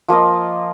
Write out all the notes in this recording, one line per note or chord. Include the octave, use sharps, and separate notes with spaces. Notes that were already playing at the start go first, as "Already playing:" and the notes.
F3 A#3 F4 D#5